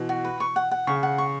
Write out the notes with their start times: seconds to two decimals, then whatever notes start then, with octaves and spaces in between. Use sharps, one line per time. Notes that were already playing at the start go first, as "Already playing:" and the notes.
Already playing: B2 E3
0.09 F#4
0.25 B4
0.40 C#6
0.56 F#5
0.71 F#5
0.87 C#3 C#6
1.03 F#5
1.18 C#6